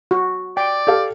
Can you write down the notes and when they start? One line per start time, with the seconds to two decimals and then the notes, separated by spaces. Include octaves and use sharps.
0.11 F#4
0.57 D5 G5
0.87 G4 A4 F5